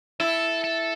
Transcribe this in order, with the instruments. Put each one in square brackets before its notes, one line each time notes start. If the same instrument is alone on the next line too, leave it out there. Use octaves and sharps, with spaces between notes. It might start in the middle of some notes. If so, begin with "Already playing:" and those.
[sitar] E4 [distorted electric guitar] A4
[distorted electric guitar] A4